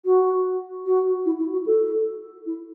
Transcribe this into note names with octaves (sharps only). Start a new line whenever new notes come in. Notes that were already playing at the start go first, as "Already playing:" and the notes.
F#4
F#4
E4
E4
F#4
A4
E4